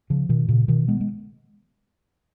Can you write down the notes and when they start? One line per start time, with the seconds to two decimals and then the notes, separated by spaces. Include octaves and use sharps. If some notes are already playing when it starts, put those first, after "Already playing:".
0.10 C#3 F3
0.29 B2 D#3
0.48 A#2 C#3
0.68 B2 D#3
0.88 G#3 B3
1.00 G#3